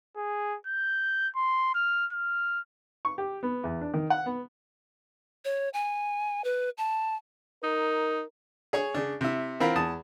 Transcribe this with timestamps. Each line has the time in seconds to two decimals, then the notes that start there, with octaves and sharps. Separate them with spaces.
0.17 G#4
0.67 G6
1.36 C6
1.75 F6
2.12 F6
3.05 C#6
3.18 G4
3.43 B3
3.64 E2
3.81 D4
3.94 D#3
4.10 F#5
4.26 B3
5.45 C#5
5.74 G#5
6.44 B4
6.78 A5
7.63 D#4 A#4
8.73 G#4 C#5 C#6
8.94 C#3 D4
9.21 C3 E4
9.60 E3 C4 F4 A#4 F5 B5
9.76 E2 A5 D#6